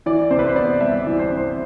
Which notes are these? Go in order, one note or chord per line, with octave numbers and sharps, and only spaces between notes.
E3 D5
C3 C5
B4
C5
B3 D5
G3 E5
D5
E3
C5
C3
C5